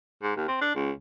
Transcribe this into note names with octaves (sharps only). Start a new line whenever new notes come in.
G#2
D#2
C4
D4
C#2